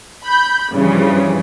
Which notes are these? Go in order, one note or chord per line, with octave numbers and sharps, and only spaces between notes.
B5 G6
G2 C#3 E3 F3